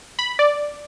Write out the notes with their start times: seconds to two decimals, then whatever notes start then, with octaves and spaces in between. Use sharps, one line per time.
0.19 B5
0.39 D5